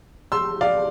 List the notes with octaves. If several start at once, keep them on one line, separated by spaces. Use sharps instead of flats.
C6 E6
D5 F5